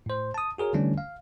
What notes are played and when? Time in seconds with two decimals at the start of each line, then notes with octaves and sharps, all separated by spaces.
0.06 A2 C5
0.34 A5 D#6
0.58 F#4 G#4 A#4 C#5
0.73 D3 E3 G3 A3 C#4 D4
0.98 F5